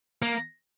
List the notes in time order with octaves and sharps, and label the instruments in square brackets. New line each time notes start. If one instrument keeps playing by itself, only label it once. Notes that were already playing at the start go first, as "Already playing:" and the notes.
[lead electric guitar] A#3